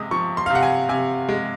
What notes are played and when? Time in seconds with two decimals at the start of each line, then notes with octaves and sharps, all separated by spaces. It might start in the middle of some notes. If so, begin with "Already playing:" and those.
Already playing: C3 G#3 D#6
0.11 F3 C#6
0.37 C6
0.46 F5
0.50 C3
0.55 F#5
0.63 G#5
0.89 C3 G#5
1.29 G#3